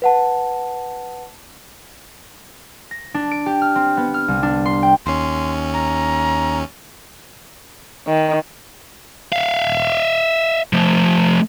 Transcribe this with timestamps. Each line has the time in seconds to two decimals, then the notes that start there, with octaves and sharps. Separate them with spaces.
0.02 B4 F#5 A5
2.91 A#6
3.14 D4
3.31 D7
3.46 G4
3.62 F6
3.75 C4
3.97 B3
4.14 F6
4.28 C2
4.43 D4
4.66 C6
4.83 G5
5.06 D#2 C#4 C6
5.74 A#5
8.07 D#3
9.32 E5 F5
10.73 F3 A3